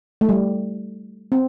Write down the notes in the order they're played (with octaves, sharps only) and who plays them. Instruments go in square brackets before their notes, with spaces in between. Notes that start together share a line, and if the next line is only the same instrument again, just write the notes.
[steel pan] A3
G3
C4